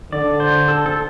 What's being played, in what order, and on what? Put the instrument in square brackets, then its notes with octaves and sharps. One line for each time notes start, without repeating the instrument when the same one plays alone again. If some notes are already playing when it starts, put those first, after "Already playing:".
[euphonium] D3 [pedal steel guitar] D5
[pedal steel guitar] C5
A4
A4